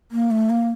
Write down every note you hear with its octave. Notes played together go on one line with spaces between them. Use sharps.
A#3
A3
A#3